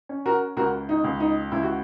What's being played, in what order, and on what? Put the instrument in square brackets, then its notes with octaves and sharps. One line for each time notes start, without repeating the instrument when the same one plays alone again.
[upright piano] C#4
F#4 A#4
C#2 F#4 A#4
D#4
C#2
D#4
C#2 E4
F#4